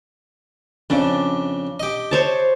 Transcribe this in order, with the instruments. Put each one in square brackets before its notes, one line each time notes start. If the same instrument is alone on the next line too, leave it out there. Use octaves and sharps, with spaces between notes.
[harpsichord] F2 C#3 [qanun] D4
[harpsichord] G4 D#5
[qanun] C5 C#5 A5